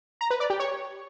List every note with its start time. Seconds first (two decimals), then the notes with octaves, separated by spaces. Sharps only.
0.21 A#5
0.30 B4
0.40 D5
0.50 G4
0.60 C#5